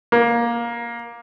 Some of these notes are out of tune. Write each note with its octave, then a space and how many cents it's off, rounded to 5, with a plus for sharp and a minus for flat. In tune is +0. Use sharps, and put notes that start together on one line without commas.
A#3 +15